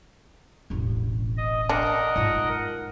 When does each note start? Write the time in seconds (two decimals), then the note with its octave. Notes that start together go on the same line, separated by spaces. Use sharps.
0.70 E1 A1
1.37 D#5
1.69 D4 A#4 D#5 F#5
2.16 G#2 F4